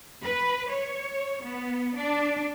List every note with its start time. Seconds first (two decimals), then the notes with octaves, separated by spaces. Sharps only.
0.25 B4
0.69 C#5
1.44 B3
1.96 D4